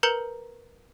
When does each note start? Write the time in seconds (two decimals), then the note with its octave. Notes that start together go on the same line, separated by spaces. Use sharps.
0.03 A#4 B4 A#5 G6 C#7 G7